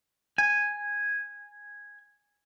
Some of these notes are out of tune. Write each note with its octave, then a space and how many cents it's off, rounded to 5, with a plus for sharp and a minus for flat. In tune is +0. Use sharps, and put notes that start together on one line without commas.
G#5 -5